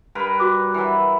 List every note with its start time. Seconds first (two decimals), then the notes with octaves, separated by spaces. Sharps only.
0.15 G2 A#4 B4
0.38 F#4 D6 F#6
0.74 E3 F#3